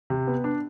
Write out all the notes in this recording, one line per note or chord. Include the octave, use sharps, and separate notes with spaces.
C3
B3
D4